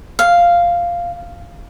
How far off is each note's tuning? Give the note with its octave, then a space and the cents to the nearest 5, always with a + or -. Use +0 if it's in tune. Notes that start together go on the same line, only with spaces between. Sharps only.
F5 -5